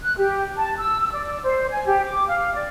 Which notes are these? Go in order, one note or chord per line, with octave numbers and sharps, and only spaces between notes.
F#6
G4
A5
E6
D5
C5
G#5
G4
D6
F5
D5